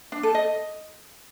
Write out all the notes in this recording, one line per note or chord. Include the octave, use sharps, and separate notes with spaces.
D4
A4
D#5